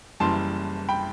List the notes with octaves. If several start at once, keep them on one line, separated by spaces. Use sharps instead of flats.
F#1 F#2 E3 G3 A5 C6
G5 B5